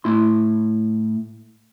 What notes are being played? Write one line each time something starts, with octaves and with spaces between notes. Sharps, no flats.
A2 E4 C6